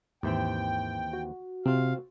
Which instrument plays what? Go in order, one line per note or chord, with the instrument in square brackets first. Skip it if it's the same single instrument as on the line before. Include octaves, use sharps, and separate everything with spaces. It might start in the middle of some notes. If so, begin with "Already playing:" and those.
[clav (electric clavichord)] D#2 E3 C4 [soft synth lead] G#2 [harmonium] G5
[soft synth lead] F#4
[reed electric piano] C3 [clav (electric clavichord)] C4 F4 [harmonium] F5